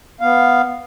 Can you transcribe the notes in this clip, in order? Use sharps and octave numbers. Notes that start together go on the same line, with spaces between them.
B3 F5